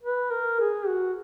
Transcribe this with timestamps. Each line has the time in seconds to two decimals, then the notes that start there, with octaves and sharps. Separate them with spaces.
0.03 B4
0.31 A#4
0.60 G#4
0.87 F#4